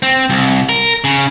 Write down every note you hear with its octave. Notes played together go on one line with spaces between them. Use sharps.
C4
C2
A#4
C#3